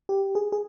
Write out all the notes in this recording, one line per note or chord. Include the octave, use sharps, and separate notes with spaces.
G4
G#4
G#4